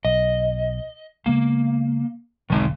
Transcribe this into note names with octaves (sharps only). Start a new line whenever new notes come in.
B1 D#5
C#3 G#3 A#3 B3
E1 B1 D3 D#3 G#3 D#4